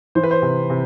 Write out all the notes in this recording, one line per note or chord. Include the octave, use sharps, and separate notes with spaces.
E3 C5
B4
C5
C3
C3